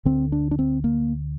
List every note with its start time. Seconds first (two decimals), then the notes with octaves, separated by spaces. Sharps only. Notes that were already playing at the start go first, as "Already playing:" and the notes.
0.05 D2 D3 C4
0.32 D4
0.51 D4
0.59 C4
0.84 A#3